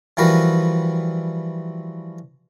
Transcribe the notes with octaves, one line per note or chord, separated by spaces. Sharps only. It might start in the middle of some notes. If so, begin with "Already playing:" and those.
E3 F3 G3 F#4 A#4 B4